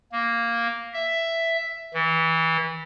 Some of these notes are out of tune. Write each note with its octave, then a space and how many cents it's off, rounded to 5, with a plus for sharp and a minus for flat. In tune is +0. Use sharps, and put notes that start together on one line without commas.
A#3 +0
E5 +5
E3 -25